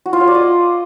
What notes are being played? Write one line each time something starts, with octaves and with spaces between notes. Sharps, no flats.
F#4
F4
C#5
D5
D#5